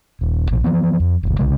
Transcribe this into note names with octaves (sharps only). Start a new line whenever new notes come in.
D#1
A#1 B2 E3
E3 F3 G#3 B3
F2
F#1 D2
C2 C#3 G#3